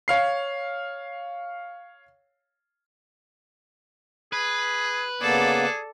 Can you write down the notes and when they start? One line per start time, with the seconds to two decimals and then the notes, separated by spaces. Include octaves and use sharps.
0.08 C#5 F5 C7
4.33 G#4 B4
5.21 C#3 A#3 B3 G#4 A4 D5